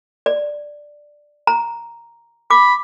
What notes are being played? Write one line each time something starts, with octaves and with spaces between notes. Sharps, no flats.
D5
A#5
B5 D6